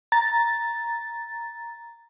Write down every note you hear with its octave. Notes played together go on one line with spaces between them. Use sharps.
A#5 A6